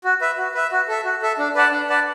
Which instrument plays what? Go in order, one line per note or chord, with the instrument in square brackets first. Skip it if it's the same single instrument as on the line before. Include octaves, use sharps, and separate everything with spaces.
[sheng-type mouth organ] F#4
B4 E5
F#4
B4 E5
F#4
A4 E5
F#4
A4 E5
D4
B4 D5 F#5 A5
D4
B4 D5 F#5 A5